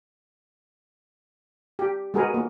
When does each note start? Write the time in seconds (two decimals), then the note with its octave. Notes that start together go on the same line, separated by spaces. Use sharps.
1.79 G4
2.14 G#3 F#4 G#4 A#4 B4
2.34 A#3